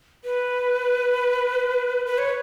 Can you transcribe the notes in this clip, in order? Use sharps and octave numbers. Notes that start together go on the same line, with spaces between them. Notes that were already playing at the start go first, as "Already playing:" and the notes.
B4
B4
C#5